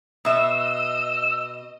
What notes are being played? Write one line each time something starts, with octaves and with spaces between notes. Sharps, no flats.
B2 D#5 E5 E6